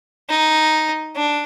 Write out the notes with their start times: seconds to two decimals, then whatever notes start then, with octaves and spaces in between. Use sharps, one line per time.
0.29 D#4
1.15 D4